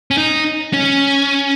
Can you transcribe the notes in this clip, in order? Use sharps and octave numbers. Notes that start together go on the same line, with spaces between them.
C#4
D#4
C#4